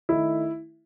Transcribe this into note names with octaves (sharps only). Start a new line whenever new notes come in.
D#3 A3 D#4 E4